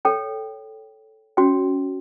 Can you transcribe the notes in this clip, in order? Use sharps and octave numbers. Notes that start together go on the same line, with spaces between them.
A4 C#5 G5
C#4 F#4 C#5 G5